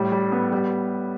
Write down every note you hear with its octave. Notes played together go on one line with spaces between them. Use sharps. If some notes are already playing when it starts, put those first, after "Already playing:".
Already playing: A2 G3
G3
B3
G3